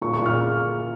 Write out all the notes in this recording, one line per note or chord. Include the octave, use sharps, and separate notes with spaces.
A#2 C#6
C#6
A#2
F6